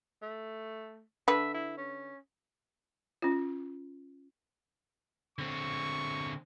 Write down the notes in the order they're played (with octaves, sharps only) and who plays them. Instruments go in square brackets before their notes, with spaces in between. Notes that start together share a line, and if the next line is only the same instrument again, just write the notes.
[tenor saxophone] A3
[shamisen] D3 B4 [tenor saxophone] E5
[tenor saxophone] E4
C#4
[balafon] C#4 F4
[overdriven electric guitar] D3 C4 [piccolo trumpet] C#6